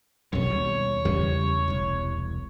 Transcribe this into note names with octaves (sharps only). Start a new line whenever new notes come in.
B1 F#2 C3 C#5
D#2 B2 G3
E2 C#3 G3
E1 C2